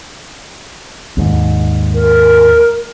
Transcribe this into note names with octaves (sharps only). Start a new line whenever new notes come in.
D#2 G#2
A#4